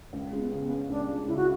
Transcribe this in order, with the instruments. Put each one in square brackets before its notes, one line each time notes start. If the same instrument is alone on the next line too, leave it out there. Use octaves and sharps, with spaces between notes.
[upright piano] C#2 [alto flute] A3
[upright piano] G#3 [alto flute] C#4
[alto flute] B3
[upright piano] C#3
[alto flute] B3
[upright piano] C#4
[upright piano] C#2 [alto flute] D4
[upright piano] G#3
[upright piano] C#3 [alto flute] E4
[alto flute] F#4